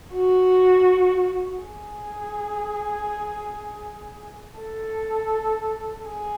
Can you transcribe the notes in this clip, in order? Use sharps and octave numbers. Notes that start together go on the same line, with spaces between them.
F#4
G#4
A4
G#4